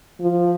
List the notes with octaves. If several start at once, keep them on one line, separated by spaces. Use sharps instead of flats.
F3